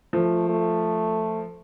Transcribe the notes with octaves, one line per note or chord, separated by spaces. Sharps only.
F3 A3
A3